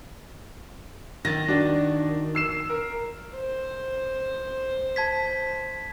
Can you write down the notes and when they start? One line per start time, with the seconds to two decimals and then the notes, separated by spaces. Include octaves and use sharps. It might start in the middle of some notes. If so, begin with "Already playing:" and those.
1.25 D#3 A6 A#6
1.48 D4 F#4
2.35 E6 C7 E7
2.70 A#4
3.35 C5
4.96 A5 G#6 B6